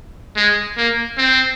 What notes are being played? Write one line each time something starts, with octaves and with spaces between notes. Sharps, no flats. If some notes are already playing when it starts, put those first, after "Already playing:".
G#3
A#3
C4